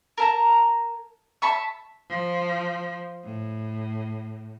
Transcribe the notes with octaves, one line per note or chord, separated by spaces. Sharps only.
A#4 A5 A#5
E5 A5 B5 C#6
F3
A2